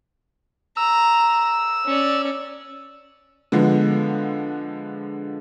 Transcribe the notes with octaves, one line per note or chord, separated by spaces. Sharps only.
A#5 E6
C#4 D5
D3 F3 G#3 B3